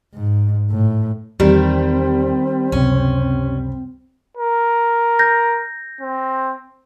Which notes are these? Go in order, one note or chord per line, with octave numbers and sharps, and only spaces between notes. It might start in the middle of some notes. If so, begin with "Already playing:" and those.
G#2
A2
E2 D#3 G3 C4
C#2 F#2 C3 C#4
A#4
G6 A#6
C4